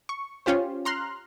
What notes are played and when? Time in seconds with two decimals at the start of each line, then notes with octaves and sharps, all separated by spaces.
0.09 C#6
0.46 C#4 F4 G4 C5
0.85 A#5 C6 F6 F#6